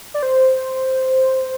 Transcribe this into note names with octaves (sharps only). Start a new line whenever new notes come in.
D5
C5